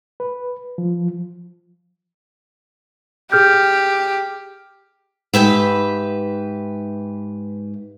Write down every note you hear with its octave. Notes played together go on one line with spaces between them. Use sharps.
B4
F3
G4 G#4 F6 G6
G#2 G4 B4 E5